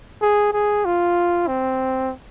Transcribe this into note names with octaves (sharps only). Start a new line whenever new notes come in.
G#4
G#4
F4
C4